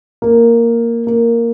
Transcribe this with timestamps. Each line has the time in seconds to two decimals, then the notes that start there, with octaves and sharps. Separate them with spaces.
0.22 A#3
1.07 A#3